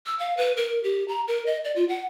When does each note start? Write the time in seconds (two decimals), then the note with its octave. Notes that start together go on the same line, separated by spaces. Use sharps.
0.06 E6
0.19 F5
0.37 B4
0.57 A#4
0.84 G4
1.08 A#5
1.28 A#4
1.46 D#5
1.65 D5
1.76 F4
1.89 F#5